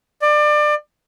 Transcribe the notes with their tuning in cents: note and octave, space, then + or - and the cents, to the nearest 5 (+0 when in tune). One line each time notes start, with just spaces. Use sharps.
D5 +30